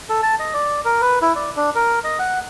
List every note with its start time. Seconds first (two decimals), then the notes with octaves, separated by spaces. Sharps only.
0.09 A4
0.23 A5
0.40 D#5
0.54 D5
0.85 A#4
1.02 B4
1.22 E4
1.36 D5
1.56 D4
1.75 A#4
2.04 D#5
2.19 F#5